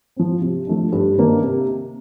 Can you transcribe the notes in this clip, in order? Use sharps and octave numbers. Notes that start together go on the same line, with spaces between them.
F3 C4
C3
F3 A3 D4
G2
D#3 A#3 D4
C3